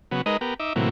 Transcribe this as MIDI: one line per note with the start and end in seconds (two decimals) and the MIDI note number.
0.11 0.22 49
0.11 0.22 54
0.11 0.22 59
0.26 0.37 56
0.26 0.37 63
0.26 0.37 70
0.26 0.37 71
0.26 0.37 75
0.41 0.54 59
0.41 0.54 67
0.41 0.54 70
0.60 0.73 63
0.60 0.73 76
0.60 0.73 86
0.76 0.89 45
0.76 0.89 48
0.76 0.89 52
0.76 0.89 54
0.76 0.89 58